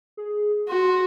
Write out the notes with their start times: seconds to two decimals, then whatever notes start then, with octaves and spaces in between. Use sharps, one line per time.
0.17 G#4
0.69 F#4 C6